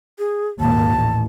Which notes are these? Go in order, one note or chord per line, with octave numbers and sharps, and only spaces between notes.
G#4
G#1 D#2 A#2 A5
A1